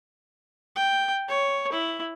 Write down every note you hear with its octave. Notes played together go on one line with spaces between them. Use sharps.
G5
C#5
E4